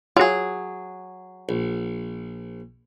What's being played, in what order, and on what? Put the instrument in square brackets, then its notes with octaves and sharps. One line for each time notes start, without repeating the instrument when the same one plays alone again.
[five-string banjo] F#3 G#4 [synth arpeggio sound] F4 F#4
[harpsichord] A#1